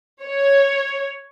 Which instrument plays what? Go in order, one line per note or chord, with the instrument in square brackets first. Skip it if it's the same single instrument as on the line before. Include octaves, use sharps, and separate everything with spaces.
[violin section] C#5